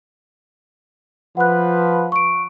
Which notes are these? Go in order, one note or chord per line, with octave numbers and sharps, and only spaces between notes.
F3 B4 F#5 F#6
C#6 D7